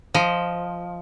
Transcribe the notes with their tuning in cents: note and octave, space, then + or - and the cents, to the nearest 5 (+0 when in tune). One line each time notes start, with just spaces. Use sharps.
F3 +0 D#5 +0